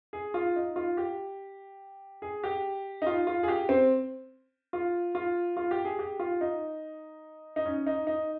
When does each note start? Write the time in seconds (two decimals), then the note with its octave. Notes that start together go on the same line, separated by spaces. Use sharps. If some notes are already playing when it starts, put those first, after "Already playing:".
0.13 G#4
0.34 F4
0.56 D#4
0.76 F4
0.97 G4
2.22 G#4
2.44 G4
3.02 D#4
3.07 F4
3.27 F4
3.43 G#4
3.48 G4
3.69 C4
4.73 F4
5.15 F4
5.57 F4
5.71 G4
5.85 G#4
5.99 G4
6.20 F4
6.41 D#4
7.56 D#4
7.66 C#4
7.86 D#4
8.07 D#4